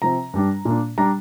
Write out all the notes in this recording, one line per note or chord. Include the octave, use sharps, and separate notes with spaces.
C3 F3 C4 A#5
G2 G3 D4
A#2 A#3 D4
G3 D4 A#5